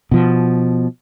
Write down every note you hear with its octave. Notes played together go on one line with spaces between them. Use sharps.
B2 F3